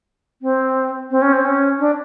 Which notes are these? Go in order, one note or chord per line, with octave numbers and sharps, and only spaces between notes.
C4
C4
C#4
C4
C#4
D4